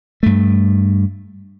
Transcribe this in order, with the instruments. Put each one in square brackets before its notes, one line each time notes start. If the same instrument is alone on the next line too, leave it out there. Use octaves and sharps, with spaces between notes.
[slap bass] G2 A3